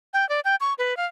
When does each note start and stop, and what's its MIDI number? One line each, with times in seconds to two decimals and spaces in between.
0.13 0.28 79
0.29 0.40 74
0.45 0.55 79
0.61 0.73 85
0.78 0.96 71
0.97 1.06 77